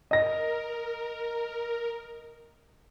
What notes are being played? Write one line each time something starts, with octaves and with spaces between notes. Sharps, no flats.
A#4 D#5 A#6